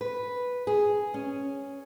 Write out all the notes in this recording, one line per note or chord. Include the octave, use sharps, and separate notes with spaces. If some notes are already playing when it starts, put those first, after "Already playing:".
B4
G#4
C#4